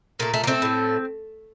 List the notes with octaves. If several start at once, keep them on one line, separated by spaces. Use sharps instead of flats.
A#2 A3 A#3
A3
A#3
A3 C4
A2 A3